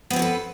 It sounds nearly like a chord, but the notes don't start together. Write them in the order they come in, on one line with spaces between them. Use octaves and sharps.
B3 C4 C#5 A4 B4